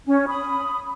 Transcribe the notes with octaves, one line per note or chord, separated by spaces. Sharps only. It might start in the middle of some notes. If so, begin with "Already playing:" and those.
C#4
B5 D#6